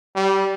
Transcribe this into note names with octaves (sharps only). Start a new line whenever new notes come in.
G3